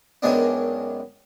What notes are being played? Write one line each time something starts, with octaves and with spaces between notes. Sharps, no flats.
F#2 D#3 F#3 G#3 B3 D4